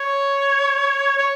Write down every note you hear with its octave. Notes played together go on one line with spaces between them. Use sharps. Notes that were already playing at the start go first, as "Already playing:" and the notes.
Already playing: C#5
C#5